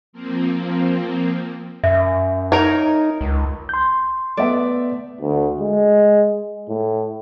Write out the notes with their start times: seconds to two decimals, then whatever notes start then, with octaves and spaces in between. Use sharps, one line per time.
0.13 F3 A#3 C4
1.84 F#2 E5
2.52 D#4 A#4 C#5
3.21 C#2
3.69 C6 G6
4.37 A3 B3 D5 E5
5.21 D2
5.60 G#3
6.69 A2